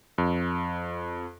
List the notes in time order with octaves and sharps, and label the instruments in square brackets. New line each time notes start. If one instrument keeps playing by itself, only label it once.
[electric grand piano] F2